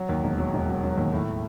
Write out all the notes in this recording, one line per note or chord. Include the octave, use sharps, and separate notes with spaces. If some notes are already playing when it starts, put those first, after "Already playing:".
Already playing: F#3
D#2
E1
F#3
E1
F#3
F#3
D#2
A2